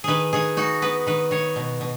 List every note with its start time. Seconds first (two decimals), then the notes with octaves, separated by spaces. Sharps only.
0.04 D#3 G#4 B4
0.33 D#3 G#4
0.57 D#4 F#4
0.82 B3 B4
1.07 D#3 B4
1.31 D#3 C#5
1.56 B2
1.81 B2